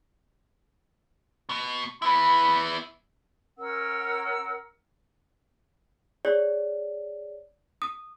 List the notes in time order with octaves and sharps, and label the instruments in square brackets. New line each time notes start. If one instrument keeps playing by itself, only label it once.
[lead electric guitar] B2
[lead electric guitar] B3 E4 [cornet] B5
[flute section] C#4 A#4 F#5 E6
[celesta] G#4 C#5 D5
D#6